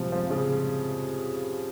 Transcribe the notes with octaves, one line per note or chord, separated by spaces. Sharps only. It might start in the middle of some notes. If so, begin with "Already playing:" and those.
Already playing: C3 F3 G3 G#3
F3
C#3